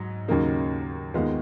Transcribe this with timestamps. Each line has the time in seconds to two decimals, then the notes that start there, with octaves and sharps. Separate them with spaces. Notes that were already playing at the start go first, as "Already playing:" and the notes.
Already playing: G#2 F#3
0.28 D#2 C#3 F#3 A#3 D#4
1.14 D#2 D#3 G#3 B3 F4